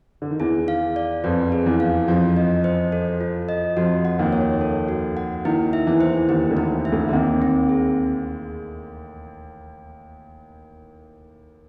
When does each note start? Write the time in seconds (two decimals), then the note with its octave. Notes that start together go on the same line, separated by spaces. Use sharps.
0.22 D3
0.31 D#3
0.40 E2 E3 G#4
0.68 F5
0.96 D5
1.24 F2 F3 B4
1.52 G#4
1.66 E2 E3
1.80 F5
2.08 F2 F3 F4
2.36 D#5
2.64 C5
2.92 A4
3.20 F4
3.49 D#5
3.76 F2 F3 F#4
4.05 F#5
4.19 D#2 D#3
4.32 C#5
4.61 A4
4.88 F#4
5.17 F#5
5.45 D#2 D#3 E4
5.73 E5
5.87 E2 E3
6.01 C5
6.17 E3
6.29 D#2 D#3 G4
6.50 D2 D3
6.57 E4
6.85 E5
6.92 D2 D3
7.08 D3
7.13 D#2 D#3 C4
7.42 C4
7.69 G#4